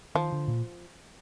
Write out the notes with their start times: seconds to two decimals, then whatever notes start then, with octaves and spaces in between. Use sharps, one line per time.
0.15 D#3 F3
0.32 D3
0.48 A#2